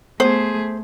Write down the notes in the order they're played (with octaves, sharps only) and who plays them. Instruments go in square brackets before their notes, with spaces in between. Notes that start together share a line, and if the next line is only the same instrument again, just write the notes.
[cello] A3 G#4 [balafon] B3 [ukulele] C5